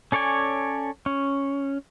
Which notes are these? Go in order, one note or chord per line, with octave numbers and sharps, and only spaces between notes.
C#4 A4 C#5 D5 G#5
C#4